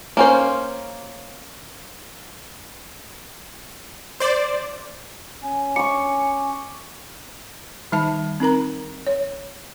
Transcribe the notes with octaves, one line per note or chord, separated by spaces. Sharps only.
A#3 C#4 C5
C5 D5
C#4 G#5
C#6 D6 C#7
D#3 G3 D#4 E5 A5
C4 D#4 A#4 A#5
C#5